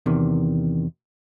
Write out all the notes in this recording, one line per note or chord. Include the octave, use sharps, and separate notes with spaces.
E2 C3 D#3